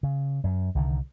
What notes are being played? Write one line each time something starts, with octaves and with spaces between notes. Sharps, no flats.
C#3
F#2
C2 D3 D#3